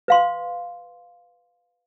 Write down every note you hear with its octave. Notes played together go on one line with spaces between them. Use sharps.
B4 F5 C6